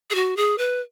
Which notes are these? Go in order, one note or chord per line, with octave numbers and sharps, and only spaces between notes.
G#4
F#4
G#4
B4